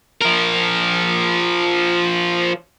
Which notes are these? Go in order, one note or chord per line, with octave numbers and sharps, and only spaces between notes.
F3 A#4